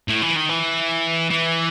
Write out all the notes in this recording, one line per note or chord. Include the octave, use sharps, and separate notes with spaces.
A2
E3
D#3
E3
E3